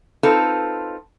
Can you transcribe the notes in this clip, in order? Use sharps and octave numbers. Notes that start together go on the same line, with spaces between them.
C4 D#4 F4 A4 B4